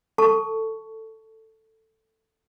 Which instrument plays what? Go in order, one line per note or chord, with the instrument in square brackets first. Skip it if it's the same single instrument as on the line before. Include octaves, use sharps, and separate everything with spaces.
[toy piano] A4 A5 C#6